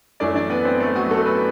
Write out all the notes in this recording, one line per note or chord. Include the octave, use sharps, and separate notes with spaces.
F#2 E3 A3 D4 D5
D4 D5
B3 B4
C4 C5
A3 A4
F#3 F#4
A3 A4
B3 B4